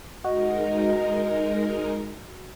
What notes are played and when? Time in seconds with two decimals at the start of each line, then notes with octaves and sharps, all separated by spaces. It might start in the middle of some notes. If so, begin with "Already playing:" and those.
0.24 G#3 D#4 F#4 A#4 D#5